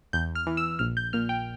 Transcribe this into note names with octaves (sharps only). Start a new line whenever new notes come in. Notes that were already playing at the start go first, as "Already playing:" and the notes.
E2 G6
F6
E3
E6
A#1 F6
G6
A#2 F6
G5